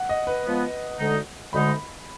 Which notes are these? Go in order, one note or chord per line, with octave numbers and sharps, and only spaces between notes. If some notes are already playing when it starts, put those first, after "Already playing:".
Already playing: F#5
D#5
B4
F3 G#3 B3
D2 D3 G#3 D#4
D2 D3 G#3 D#4 B5